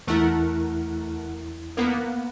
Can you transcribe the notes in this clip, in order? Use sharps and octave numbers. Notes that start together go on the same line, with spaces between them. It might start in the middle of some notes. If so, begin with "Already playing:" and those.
E2 A3 E4 A#4 F#5
A#3 B3